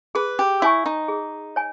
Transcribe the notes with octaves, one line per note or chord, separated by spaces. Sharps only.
G#4 B4
G4
E4 C#5 G#5 C#6
D#4
G#4
C#5 G#5